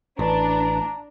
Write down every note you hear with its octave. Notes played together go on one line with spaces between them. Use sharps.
A1 D4 B4 A#5